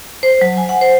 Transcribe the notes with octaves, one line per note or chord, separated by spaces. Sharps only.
C5
F#3
G#5
F#5
C5